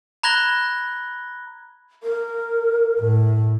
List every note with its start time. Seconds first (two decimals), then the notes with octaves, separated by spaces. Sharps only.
0.23 A#5 B5 F#6 G#6 A#6 G7
2.03 A#4
3.01 A2